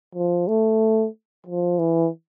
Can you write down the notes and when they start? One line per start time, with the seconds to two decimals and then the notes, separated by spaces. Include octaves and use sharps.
0.15 F3
0.48 A3
1.47 F3
1.79 E3